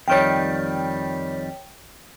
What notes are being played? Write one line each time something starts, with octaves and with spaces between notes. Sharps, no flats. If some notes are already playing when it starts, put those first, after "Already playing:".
F2 D#3 G3 C#5 G5